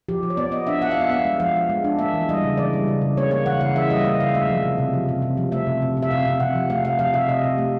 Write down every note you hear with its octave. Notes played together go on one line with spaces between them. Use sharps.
F3 G4
F3
C#5
B3 D5
B3 D#5
D4 E5
B3 F#5
F5
B3
E5
B3 F5
G#3
F3 F5
F3
G#3
D4
A#3 E5
E3
G3 D#5
C#3
E3 D5
G3
C#3
C#3
A#3 C#5
A#3 C#5
E3 F#5
C#3 F5
E3 E5
G3 D#5
A#3 D#5
C#3 F5
A3 E5
F3
C3
C3
F3
C3
C3
F3
A3 E5
C3
C3
C3
E5
C3 F5
C3
C3 F#5
F3
A3 F5
C3 F5
F3 F5
C3 E5
C3 D#5
C3
A3